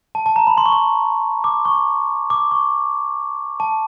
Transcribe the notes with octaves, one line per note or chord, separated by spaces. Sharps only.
A5
A5
A#5
B5
C6
C#6
C6
D6
C#6
D6
C#6
A5